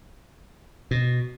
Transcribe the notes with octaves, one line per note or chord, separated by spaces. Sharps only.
B2